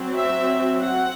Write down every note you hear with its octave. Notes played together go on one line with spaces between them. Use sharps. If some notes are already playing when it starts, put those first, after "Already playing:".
Already playing: F#3 C4
E5
F#5